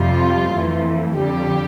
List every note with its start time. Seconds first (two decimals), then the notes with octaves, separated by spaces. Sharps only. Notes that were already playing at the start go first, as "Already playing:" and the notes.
Already playing: F2 C3 G3 F4
0.51 F2 E3 A3
1.14 F2 D3 G3 G4